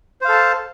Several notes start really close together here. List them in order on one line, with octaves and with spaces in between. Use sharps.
C5 F5 A4 A5